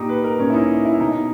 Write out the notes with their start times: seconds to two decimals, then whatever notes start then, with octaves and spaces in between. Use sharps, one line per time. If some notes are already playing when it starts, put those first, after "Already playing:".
Already playing: A#2 D#4 G4
0.09 B4
0.24 A#4
0.39 A#2 C#4
0.50 E4
0.54 D#4
0.85 E4
1.00 B2 D#4